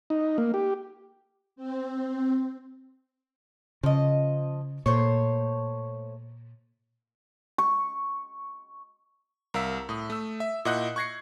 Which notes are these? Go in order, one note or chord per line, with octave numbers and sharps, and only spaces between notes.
D#4
A#3
G4
C4
C#3 F3 D#5
A#2 A3 C5 C#5
C#6
C2 A#4 F5 E6 B6
A2 D#6
A3 E6
E5
A#2 E4 D#5 F#5 F#6 G6
C#6 F#6 G#6 A#6 C7 C#7